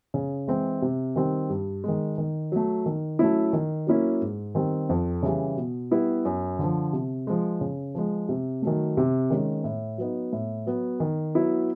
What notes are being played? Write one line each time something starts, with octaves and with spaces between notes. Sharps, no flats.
C#3
E3 G#3 C4
C3
D#3 G3 C4
G2
D#3 G#3
D#3
F#3 A3
D#3
F#3 A3 C#4 E4
D#3
F#3 A#3 C#4 E4
G#2
D#3 G3 C4
F2
C#3 E3 G3
B2
G3 B3 E4
F#2
D3 F3
C3
F3 G#3
C#3
F3 G#3
C3
D#3 F#3 A3
C3
D#3 G#3 C#4
A2
F#3 B3 D#4
A2
F#3 B3
D#3
F#3 B3 E4